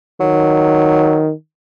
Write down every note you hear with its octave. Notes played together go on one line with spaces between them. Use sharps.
D#3 F#3